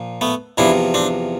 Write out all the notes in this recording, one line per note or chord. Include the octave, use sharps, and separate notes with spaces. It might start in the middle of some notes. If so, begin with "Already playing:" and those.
Already playing: A#2 F3
A3 B3
E2 C3 F3 D4 E4
C4 D4